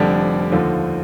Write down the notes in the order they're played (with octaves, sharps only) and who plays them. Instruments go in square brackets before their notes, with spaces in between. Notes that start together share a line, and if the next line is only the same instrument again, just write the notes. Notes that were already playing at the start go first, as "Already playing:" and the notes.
Already playing: [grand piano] F1 F2 D3 G3 D4
D#2 D3 F3